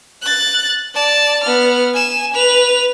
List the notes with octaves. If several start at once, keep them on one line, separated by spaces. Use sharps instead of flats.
F#6 A6
D5 A5
B3 F6
G#5 E7
B4 F7